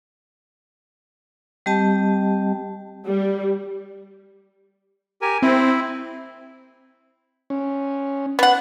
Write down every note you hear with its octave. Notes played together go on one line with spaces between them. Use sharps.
G3 C4 G4 D#5 G5 A5
G3
G4 A#4 G#5
C4 E4
C#4
B3 F#5